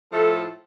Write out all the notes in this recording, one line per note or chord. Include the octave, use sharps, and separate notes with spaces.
A2 F3 A3 A4